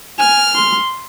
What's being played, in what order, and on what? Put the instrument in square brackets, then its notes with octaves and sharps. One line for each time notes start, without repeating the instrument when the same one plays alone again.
[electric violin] G#5 [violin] F6
[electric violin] C6